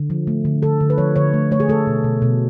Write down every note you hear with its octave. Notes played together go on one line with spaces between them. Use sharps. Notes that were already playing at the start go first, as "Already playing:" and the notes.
Already playing: D3
F3
A3
D3
D3 A4
D3
B4
F3 C#5
D3 C#5
A3
A3 C#5
G#4
A3 A4
B2
B2
B2